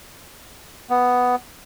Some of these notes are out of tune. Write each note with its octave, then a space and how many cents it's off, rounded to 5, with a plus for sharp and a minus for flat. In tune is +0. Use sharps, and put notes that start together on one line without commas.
B3 +5